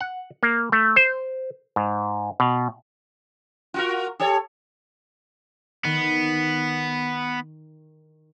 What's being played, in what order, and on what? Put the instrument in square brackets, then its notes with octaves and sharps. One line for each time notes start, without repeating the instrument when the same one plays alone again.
[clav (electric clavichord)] F#5
A#3
A3
C5
G#2
B2
[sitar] F4 F#4 A#4
G4 A4 C#5
[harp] D#3 [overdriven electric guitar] B3